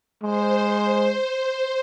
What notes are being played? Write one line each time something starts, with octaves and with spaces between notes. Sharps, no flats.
G#3 C5